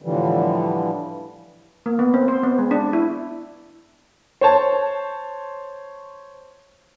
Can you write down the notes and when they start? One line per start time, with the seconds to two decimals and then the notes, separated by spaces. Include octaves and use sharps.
0.02 A2 D3 E3 F3 G3
1.86 A#3
1.99 B3
2.14 C4
2.28 C5
2.43 B3
2.59 G#3
2.71 D4
2.93 E4
4.41 C5 C#5 A5